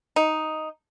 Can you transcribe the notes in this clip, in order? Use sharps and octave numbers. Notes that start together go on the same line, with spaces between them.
D#4